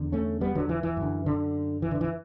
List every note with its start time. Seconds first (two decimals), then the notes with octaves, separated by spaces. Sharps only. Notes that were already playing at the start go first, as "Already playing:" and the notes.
Already playing: E2 D3
0.12 A3 C#4
0.41 G3 B3
0.55 D3 F#3
0.69 E3
0.83 E3
0.97 F#2
1.02 D3
1.26 D3
1.82 E3
1.91 D3
2.01 E3